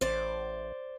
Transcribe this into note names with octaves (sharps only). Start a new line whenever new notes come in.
A1 C5 D5